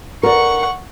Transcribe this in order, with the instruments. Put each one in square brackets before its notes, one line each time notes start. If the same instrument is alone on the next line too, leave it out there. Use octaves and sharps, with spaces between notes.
[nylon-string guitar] A#4 D5 [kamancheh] F#5 C#6